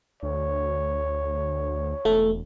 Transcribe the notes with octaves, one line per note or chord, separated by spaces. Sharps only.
D2 C#5
E1 A3